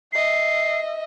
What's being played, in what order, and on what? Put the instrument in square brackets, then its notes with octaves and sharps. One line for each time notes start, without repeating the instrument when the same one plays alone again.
[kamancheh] D#5 E5 [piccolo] C7